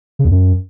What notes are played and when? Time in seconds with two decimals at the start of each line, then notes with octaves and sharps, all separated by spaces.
0.19 C#3
0.25 E2
0.31 F#2